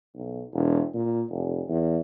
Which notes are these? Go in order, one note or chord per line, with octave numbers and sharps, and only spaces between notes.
B1
E1
A#2
F1
E2